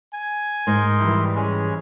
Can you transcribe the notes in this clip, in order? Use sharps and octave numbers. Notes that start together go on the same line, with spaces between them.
G#5
G#2 D#4 A#4 C6
E3 G3 E4
G#3 C#4 G#4